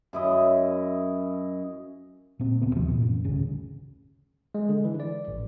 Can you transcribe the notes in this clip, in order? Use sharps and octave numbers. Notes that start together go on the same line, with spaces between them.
F#2 E4 D#5
A#2 C4
D#1 C3 B3
D#2 C3 F3
A#2 E3
F#2
D#1 A1 D2 C#3
G#3
D3
E3
D5
A1